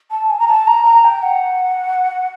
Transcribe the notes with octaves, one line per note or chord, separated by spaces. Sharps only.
A5
G#5
A#5
A5
A#5
A#5
G5
F#5